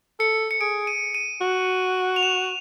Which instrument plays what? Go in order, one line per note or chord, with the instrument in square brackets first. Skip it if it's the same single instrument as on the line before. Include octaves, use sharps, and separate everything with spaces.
[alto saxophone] A4 [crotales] C#7
[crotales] C#7
[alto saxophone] G#4 [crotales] D7
[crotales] D#7
D#7
[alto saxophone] F#4
[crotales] F7
E7